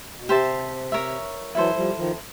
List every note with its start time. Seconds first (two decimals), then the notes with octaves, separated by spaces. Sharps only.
0.19 B2
0.29 C3 G4 C5 E5 A5
0.92 A#4 C#5 E5
1.55 E3 F#3 E4 A4 C5
1.75 F3 G3
1.97 D#3 F3